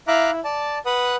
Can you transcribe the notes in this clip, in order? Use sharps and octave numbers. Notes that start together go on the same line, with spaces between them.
E4 E5 F5 A#5 D6 F#6
E4
D5 A5
B4 F#5 D#6